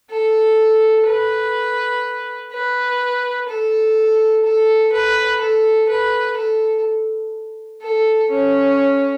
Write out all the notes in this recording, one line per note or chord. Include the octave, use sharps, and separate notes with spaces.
A4
B4
B4
A4
A4
B4
A4
B4
A4
A4
C#4